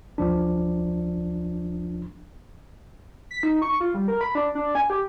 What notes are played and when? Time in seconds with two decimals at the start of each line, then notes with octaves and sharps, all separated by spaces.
0.18 D2 F3 D4
3.31 B6
3.43 D#4
3.62 C#6
3.80 F4
3.94 G3
4.08 A#4
4.21 B5
4.35 D4
4.55 D4
4.75 G#5
4.90 G4